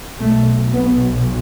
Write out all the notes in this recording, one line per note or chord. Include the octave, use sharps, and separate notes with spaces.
B1 B2 A3
B3